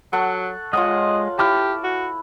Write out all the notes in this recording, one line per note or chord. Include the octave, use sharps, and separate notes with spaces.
F#3 A4 F#5 C#6
G#3 F4 C#5 D#5 F#5 D#6
E4 G4 A5 D6 F6
F#4